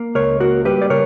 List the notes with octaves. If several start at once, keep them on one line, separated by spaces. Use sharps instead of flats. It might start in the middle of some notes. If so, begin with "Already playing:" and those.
Already playing: A#3
C#2 A#4 C#5
A#3 F#4 A#4
G3 G4 B4
D5
C#3 A#4 C#5